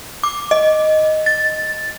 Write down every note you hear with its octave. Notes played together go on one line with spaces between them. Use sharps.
D6
D#5
A6